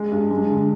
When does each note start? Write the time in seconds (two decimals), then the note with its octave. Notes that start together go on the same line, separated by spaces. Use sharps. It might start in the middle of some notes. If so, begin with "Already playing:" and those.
Already playing: G#3
0.12 G2
0.31 G#3
0.50 D3